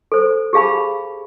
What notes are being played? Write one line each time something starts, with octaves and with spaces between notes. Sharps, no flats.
A4 C5
G4 G#4 F5 A5 B5